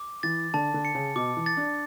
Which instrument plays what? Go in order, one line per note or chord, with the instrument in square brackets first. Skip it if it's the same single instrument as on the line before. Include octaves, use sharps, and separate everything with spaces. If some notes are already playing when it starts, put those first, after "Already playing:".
Already playing: [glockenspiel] D6
[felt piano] E3 [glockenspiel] A6
[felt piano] D3 [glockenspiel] A5
[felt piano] D3
[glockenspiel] C#7
[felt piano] C#3
[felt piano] B2 [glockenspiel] D6
[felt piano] E3
[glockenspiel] A6
[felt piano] D4